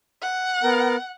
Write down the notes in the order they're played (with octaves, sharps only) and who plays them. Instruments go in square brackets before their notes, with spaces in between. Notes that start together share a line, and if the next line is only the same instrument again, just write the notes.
[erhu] F#5
[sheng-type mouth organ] B3 A#4